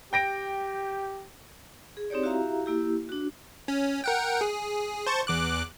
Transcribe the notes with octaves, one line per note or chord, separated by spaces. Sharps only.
G4 G5 A#6 D7
G#4
C4 D#4 G4 C#5 D5
E4 F#4 G4 E5 F5 A#5
A#3 E4 G4
D4 F#4
C#4
A#4 F#5 G5
G#4
C5 A5 C#6
E2 D6 F#6